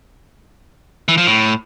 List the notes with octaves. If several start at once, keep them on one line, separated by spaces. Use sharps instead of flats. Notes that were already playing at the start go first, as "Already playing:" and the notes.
E3
F3
A2